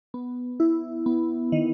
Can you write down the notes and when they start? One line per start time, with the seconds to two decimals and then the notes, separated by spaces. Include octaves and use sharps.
0.14 B3
0.60 E4
1.06 B3
1.52 D#3